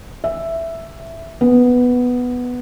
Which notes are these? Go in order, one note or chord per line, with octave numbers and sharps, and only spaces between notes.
E5
B3